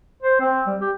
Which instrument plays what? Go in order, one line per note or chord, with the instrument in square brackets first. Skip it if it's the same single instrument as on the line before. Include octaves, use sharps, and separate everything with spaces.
[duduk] C5
C4
G3
G4